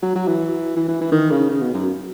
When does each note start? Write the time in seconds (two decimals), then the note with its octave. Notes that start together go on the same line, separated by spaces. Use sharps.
0.03 F#3
0.15 F#3
0.28 E3
0.76 E3
0.88 E3
1.01 E3
1.12 D#3
1.31 C#3
1.50 C#3
1.61 B2
1.74 F#2